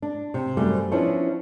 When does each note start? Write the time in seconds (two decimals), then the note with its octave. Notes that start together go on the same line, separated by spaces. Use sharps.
0.02 D4
0.34 C3
0.57 F#2 G3 A3 C4
0.91 F3 B3 C#4 D4 E4